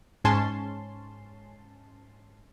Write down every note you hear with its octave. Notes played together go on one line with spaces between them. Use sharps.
G#2 C#4 A5 C6